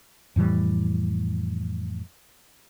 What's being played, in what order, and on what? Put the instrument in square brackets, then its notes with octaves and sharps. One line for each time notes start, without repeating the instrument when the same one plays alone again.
[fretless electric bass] F2 A2 E3 G3